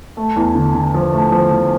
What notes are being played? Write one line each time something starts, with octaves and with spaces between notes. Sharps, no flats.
A3
E2
D3
D3
F3
A3
F3
F3